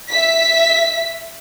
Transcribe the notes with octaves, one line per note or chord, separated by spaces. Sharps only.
E5 B6